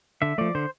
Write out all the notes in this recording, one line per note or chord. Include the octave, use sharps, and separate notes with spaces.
D3 E5
F3 A3 D5
D3 C5